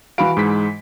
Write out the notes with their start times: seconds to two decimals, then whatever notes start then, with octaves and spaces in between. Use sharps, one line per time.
0.18 E3 F#4 F5 B5 D7
0.37 G#2 G#3 B6